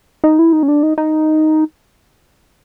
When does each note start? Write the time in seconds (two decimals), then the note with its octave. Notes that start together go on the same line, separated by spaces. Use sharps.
0.24 D#4
0.39 E4
0.53 D#4
0.63 C#4
0.68 D4
0.83 D#4
0.98 D#4